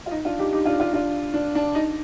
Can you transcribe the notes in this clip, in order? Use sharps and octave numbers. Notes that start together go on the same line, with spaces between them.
F4
D#4
D4 F4
D#4 G4
D#4 G4
D4 F4
D4 F4
D4 F4
D4
D4
D#4